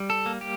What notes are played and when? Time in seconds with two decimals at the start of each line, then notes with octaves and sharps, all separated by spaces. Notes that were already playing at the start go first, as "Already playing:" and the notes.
Already playing: G3
0.10 A4
0.26 A#3
0.41 G4